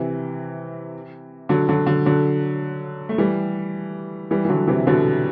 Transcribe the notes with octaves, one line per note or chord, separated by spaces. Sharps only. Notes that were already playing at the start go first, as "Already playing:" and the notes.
Already playing: C3 E3
D3 F#3
D3 F#3
D3 F#3
D3 F#3
A3
E3 G3
E3 G3
E3
D3 F#3
C3 E3
B2 D3